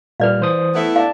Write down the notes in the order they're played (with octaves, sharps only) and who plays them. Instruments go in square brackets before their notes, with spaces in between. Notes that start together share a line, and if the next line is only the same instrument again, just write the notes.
[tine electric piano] A#2 G3 F6 [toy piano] B4 D5 F5
[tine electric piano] E3 C5 D#6
[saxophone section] A3 B3 E4
[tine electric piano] D5 A5 [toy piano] F5